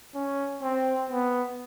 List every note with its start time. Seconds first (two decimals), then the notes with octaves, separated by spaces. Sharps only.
0.15 C#4
0.63 C4
1.10 B3